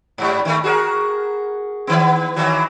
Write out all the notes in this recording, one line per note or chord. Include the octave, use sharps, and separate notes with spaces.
G#2 G3
D#3 A3
F#4 G#4 A#4
D#3 B3
D#3 E3 F#3